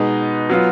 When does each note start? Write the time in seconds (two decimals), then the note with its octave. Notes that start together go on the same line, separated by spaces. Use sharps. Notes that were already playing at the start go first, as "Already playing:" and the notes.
Already playing: B2 G#3 B3 D#4
0.50 F#3 B3 F4